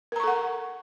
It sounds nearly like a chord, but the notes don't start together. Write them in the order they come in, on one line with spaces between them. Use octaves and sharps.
A#4 A#5 C#6 A4 F#5